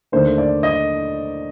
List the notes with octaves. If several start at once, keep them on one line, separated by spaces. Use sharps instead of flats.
D#2 D3 A3 D4 C5
D5
D#5